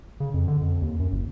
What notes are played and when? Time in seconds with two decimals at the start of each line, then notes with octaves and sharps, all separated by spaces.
0.20 C#3
0.34 F2
0.48 D3
0.61 F2
0.82 D#2
0.99 F#2
1.12 F#1